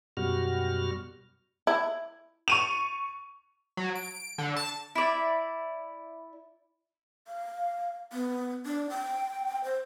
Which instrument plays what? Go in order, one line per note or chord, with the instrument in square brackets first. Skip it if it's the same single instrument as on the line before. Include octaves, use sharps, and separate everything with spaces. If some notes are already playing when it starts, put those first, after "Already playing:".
[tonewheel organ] F#2 B2 G3 F#4 F6
[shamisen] E4
[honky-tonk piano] C#6 D#7 F7
[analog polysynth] F#3
D7
D3
A5
[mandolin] E4 D5
[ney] F5
B3
D4
G5
C5